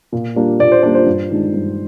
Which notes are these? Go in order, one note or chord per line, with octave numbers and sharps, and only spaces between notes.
A#2
G3 A#3 D4
A#2 D5
C5
G3 A#3 D4 D5
C5
G2
D#3 G#3 D4
G2